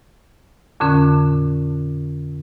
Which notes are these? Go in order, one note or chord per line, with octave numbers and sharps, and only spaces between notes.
F2 A#2 D3 C#4